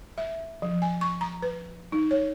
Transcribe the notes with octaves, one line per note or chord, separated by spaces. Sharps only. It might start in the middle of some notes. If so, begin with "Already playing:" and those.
E5
F3
G#5
C#6
A#5
B4
D#4
C#5